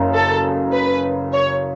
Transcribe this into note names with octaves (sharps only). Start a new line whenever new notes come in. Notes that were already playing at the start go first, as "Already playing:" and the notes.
Already playing: F#1 F#2 C#3
A4
B4
C#5